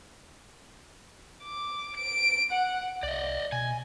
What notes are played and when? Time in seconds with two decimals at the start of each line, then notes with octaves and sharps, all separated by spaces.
1.44 D6
1.96 D7
2.51 F#5
3.03 C2 D5 D#5
3.52 B2 G#5